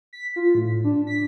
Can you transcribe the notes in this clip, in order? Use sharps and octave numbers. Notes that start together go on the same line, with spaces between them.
B6
F4
A2
D4
B6